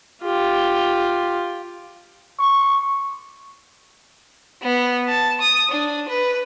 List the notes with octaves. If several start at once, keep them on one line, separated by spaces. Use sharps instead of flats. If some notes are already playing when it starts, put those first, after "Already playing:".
F4 G4
C#6
B3
A5
D#6
D4
B4